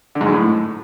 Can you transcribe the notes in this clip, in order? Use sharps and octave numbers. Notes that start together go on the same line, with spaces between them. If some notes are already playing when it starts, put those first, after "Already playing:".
D3
G#2
F#2
A2